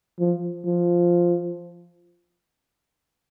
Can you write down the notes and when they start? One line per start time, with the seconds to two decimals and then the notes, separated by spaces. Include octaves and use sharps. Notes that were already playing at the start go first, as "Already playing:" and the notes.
0.19 F3
0.66 F3